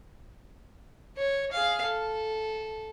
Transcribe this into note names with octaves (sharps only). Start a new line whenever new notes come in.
C#5
G#4 F5
A4